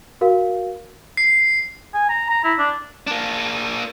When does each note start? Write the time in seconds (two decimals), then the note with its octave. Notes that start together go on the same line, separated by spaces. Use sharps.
0.21 F#4 A#4 F5
1.17 C7
1.94 G#5
2.09 A#5
2.30 A#5
2.44 E4
2.59 D4
3.07 A#3 D4